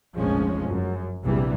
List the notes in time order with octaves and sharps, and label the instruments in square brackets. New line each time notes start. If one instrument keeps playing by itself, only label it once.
[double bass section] F1 A#1 F3 G#3 C#4
F#2
A#1 E2 C3 E3 G3